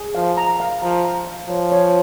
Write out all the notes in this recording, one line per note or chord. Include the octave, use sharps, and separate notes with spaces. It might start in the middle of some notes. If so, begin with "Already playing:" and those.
Already playing: G#4
F3 F5
A#5
F5
F3 A#5
A#5
F5
F3 C#5
C#5